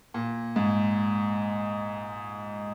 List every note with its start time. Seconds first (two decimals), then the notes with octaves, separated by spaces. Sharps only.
0.14 A#2
0.56 G#2